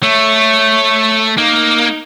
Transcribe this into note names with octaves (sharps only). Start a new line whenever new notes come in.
A3 C#5
A#3 D#4